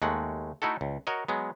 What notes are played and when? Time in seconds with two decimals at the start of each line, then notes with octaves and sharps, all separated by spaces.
0.02 D#2 G#3 A3 F#5
0.62 A3 D#4 E4 F#4 A4
0.81 C#2
1.07 F#4 A#4 C#5 D#5
1.28 F#3 G#3 B3